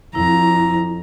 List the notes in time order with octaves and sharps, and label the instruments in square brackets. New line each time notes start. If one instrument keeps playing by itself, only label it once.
[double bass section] F2 [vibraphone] E4 [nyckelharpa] A#5